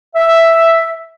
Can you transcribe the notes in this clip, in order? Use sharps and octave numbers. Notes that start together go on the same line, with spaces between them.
E5